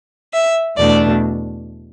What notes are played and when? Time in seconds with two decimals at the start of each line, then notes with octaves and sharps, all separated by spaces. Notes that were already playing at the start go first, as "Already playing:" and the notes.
0.33 E5
0.78 E2 B2 A3 D4 D5